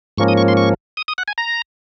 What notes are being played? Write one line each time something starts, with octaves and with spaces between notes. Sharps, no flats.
G#2 F3 A#3 C#4 C#6
D#6
C#6
C6
C#6
D#6
D#6
F#5
G#5
A#5